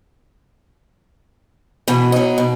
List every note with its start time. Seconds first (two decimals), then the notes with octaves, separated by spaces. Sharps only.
1.88 B2 E3
2.12 F#3 D#4
2.38 B2